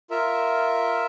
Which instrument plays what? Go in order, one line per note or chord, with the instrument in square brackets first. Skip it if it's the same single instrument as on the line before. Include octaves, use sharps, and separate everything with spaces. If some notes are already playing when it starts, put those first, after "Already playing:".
[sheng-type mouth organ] F4 A#4 E5